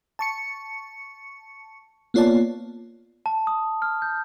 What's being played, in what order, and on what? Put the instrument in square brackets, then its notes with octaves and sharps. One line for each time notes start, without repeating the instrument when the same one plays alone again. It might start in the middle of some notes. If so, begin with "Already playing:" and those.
[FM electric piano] A5 C#6 C#7
A#3 B3 F4 C#5 D5 A5
[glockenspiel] A5
D#6
F6
G6